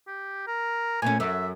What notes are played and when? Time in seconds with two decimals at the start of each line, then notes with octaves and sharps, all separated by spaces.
0.07 G4
0.47 A#4
1.02 A#2 A3 C#4 G#5
1.20 F#2 E5